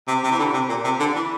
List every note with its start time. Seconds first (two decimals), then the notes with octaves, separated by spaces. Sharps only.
0.08 C3
0.23 C3
0.31 E3
0.39 D3
0.54 C3
0.69 A#2
0.84 C3
0.99 D3
1.15 E3